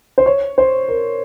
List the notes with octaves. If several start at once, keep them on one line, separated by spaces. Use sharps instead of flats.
C5
C#5
C5
A#4